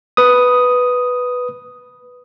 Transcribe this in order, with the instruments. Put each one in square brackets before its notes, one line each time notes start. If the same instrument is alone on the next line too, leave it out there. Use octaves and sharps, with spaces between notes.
[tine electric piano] B4 D#6